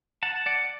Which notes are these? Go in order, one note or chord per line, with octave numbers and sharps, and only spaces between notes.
F#5 A5
D5 F#5